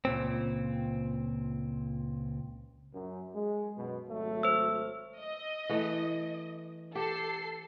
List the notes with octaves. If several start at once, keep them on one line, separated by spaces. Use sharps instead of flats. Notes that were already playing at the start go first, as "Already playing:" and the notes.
C#2 A#2 C4
F#2
G#3
F#2 B2
G#1 F#3 A3
C5 E6
D#5
E3 A3
G4 A4 C7